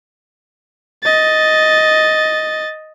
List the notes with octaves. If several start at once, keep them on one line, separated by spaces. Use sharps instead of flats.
D#5 A6